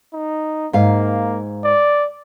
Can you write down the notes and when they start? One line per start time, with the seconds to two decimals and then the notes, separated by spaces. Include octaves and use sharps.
0.13 D#4
0.73 G#2 A#3 F5
1.64 D5